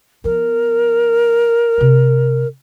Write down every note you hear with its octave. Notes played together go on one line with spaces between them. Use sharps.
F3 B3 A#4
C3 C4